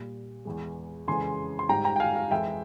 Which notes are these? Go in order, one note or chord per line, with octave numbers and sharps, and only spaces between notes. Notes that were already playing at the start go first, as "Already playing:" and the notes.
Already playing: A#2 G3
E2 E3 G#3
F2 C#3 E3 G#3 G#5 C6
C6
G#2 G3 G5 A#5
G5 A#5
G5
F5 G#5
F5
F2 E3 G#3 E5 G5